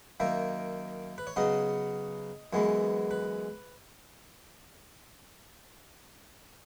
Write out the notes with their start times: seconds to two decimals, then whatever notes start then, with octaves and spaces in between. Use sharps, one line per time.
0.20 F#2 D#3 A#3 E5
1.18 B4
1.27 C#5
1.36 C#3 F#3 B3 D#5
2.53 F#2 E3 G#3 B3
3.11 B4